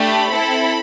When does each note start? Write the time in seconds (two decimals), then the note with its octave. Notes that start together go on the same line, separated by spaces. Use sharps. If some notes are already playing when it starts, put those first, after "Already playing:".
Already playing: A3 D4 G4 B5
0.30 C4 E4 A4